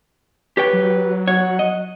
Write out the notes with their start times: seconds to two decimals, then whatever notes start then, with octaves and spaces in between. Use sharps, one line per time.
0.57 G4 B4 C#5 G5
0.73 F#3
1.28 C#5 F#5
1.59 D#5